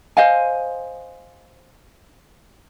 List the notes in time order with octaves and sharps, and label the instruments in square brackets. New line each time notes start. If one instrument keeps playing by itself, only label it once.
[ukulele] C5 D#5 F5 G#5